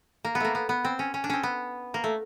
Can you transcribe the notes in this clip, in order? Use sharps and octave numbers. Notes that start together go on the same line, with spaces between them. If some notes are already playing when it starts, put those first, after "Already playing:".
A#3
B3
A3 A#3
B3
B3
C4
C#4
C#4
D4
C4 C#4
B3
A#3
A3